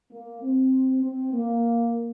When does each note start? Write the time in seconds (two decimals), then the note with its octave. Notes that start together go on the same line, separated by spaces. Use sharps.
0.12 A#3
0.43 C4
1.04 C4
1.34 A#3